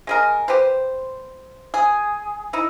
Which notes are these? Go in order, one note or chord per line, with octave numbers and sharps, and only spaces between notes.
G#3 G#4 A#4
G4 B4 C5
G#4
D#4 E4